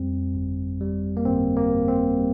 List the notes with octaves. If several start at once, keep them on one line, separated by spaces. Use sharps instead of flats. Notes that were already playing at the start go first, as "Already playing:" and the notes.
Already playing: F2 G3 C4
G1
G3
A#3
G1 C4
A#3
G1
C4
G3